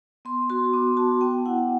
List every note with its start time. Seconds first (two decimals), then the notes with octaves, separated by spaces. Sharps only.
0.25 B3 C6
0.50 F#4 C6
0.73 B3 D6
0.97 F#4 A5
1.21 B3 G5
1.46 E4 F#5